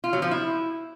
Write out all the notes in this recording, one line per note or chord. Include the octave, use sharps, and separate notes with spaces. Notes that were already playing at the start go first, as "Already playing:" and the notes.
F4
F#3
F3
E4